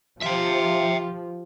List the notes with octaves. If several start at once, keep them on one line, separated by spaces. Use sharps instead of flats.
F3 F4 G4 E5 G5